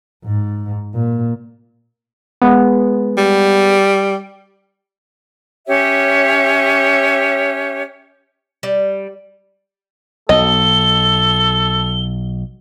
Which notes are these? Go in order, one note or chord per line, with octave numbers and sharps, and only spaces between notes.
G#2
A#2
G#3 B3
G3
C#4 G4 C#5 E5
G3
B1 A4 D#5 G7